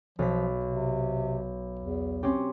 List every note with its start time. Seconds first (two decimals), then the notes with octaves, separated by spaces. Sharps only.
0.19 B1 F3 B6
0.65 C3
1.79 E2
2.23 C4 C#4 G4